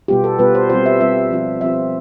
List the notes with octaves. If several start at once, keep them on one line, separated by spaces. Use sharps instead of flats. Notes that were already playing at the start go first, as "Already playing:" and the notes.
B2 G3 B3 F4 G4
A4
B2 G3 B3 F4 B4
C5
G3 C4 F4 C5
E5
G3 C4 F4 E5
F3 C4 F4
F3 C4 F4 E5